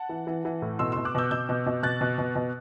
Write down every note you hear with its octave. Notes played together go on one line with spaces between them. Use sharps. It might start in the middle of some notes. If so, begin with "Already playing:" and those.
Already playing: F#5 A5
E3
E3
E3
A2
B2 C6 E6
B2 C6 E6
D6 F#6
B2 E6 G6
B2 E6 G6
B2
B2
B2 F#6 A6
B2
B2
B2